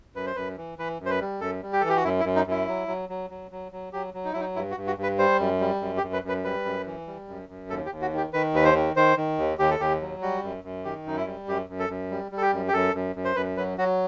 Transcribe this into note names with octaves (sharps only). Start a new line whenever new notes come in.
F#2 B4
C5
F#2 B4
E3
E3 B4
F#2
C5
B4
G3
F#2 A4
G3
G4
E3 A4
G4
F#4
F#2 E4
E4
F#2
D#4
F#2 E4
F#3
F#3
F#3
F#3
F#3
F#3
F#3 G4
F#3
D#4
F#3 E4
D#4
G2 E4
F#4
G2
F#4
G2
B4
G3 C5
F#2
G3
F#2
G4
F#2
B4
F#2 B4
G3 B4
F#2
E3
G3
F#2
F#2
D#2 A4
G4
D#2
F#4
D#3 G4
D#3 B4
D#2 B4
C5
D#3
D#3 C5
D#3
D#2
D#2 G4
A4
D#2 G4
F#3
G3 F#4
F#2
F#2
D#3 G4
F#2 D#4
E4
G3
F#2 G4
F#2
A4
F#2
G3
G3
A4
G4
F#2
G4
F#2 A4
F#2
F#2
C5
F#2 B4
F#3 B4
F#3 F#4